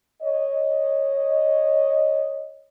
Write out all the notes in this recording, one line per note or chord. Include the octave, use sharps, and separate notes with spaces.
C#5 D#5